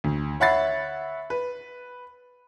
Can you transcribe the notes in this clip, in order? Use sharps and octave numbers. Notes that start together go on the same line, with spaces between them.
D2
C#5 E5 F#5 B5 A6 C7
B4